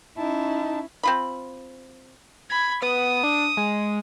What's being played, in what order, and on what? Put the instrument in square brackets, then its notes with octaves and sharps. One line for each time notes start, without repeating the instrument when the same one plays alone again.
[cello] C#4 E4 [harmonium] D#4 A5
[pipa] C4 F4 B5
[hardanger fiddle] B5 [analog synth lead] G#6
[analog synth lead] B3 [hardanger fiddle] D#6
[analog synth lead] D4
G#3